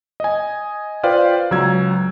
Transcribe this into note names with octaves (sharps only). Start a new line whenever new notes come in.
D#5 G#5
F4 B4 C5 D5 F5 G5
C#2 F#3 E6 G#6